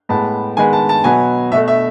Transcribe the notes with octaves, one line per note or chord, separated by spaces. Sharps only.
A2 G#3 B3 A5
D#3 G#3 B3 G#5
A5
A5
B2 F#3 B3 G#5
B2 A3 E5
E5